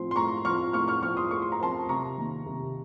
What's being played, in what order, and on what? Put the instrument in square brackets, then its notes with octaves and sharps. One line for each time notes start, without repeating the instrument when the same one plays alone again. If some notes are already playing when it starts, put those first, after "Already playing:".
Already playing: [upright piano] A2 F3 C4 C6
C6
A2 A#5 C#6
F3 C#6 F6
C4
A2 C#6 F6
C#6 F6
F3 C4 C#6 F6
C6 D#6
A2 C#6
C6
A#5
F3 C4 A5 C6
C3 A#5 C#6
D#3 A#3
C3